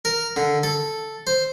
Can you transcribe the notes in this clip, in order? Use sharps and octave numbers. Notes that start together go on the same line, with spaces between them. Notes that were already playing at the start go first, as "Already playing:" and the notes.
A#4
D3
A4
C5